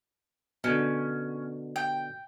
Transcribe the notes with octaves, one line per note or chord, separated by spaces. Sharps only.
B2 D3 C#4
G5